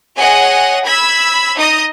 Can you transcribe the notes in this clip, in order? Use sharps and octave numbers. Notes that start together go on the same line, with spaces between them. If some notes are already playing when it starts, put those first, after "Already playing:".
G#4 C#5 D#5 F#5 G#5
B5 E6 G#6 B6
D#4 D#5 D#6